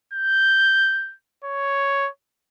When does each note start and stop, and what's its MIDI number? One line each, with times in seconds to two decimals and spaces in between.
0.13 1.14 91
1.44 2.09 73